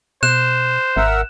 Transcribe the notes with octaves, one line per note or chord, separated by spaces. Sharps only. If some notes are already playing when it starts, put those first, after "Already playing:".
B2 C5 F#6 E7
G#1 A#4 E5 F#5